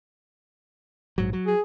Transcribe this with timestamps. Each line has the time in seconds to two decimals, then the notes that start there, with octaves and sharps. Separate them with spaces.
1.18 A#1 G#2 F#3
1.33 F#3
1.47 G#4